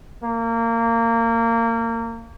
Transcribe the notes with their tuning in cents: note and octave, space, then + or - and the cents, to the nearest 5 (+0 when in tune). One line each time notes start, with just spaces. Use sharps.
A#3 -25